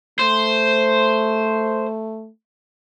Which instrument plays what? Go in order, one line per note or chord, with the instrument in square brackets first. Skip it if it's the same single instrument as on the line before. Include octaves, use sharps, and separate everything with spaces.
[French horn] A3 [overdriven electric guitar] C5